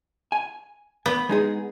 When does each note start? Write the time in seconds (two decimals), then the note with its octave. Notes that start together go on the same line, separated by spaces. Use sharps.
0.32 G#5
1.06 B3
1.29 G#3 D#4 G#4